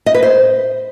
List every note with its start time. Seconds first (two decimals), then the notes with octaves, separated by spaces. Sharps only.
0.06 D#5
0.14 B4
0.23 C5